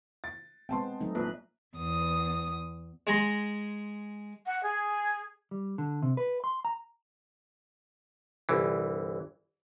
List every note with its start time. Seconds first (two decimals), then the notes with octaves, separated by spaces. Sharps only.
0.24 A6
0.69 G#3 B3 C4 G5 A5 C6
1.01 F#3 A3 D#4
1.15 A#1 B4
1.76 E2 D#6
3.07 G#3 G#4 A#5 C6
4.45 F#5
4.63 G#4
5.51 G3
5.78 D3
6.02 C3
6.17 B4
6.44 C6
6.65 A#5
8.49 G1 C2 E3